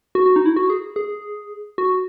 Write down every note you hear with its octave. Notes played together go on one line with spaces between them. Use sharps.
F#4
F#4
D#4
E4
F#4
G#4
G#4
F#4